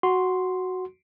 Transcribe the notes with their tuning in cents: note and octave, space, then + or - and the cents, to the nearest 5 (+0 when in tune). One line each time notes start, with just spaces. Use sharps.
F#4 +0 C6 +0